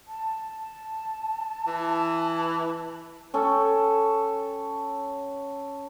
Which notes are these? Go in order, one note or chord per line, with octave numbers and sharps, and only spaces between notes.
A5
E3
C#4 A4 G5